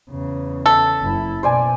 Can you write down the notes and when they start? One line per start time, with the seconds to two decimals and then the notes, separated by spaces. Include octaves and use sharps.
0.10 E2 C#3
0.66 A4 E5 A5
1.01 F#1 E4
1.43 B2 C5 D5 G#5